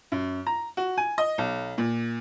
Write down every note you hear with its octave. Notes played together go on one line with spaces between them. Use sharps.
F#2
A#5
F#4
G#5
D#5
B1
A#2